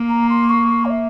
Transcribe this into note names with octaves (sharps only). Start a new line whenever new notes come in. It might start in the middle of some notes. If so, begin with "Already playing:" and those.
Already playing: A#3
A#5
C6
C#6
C#5
E5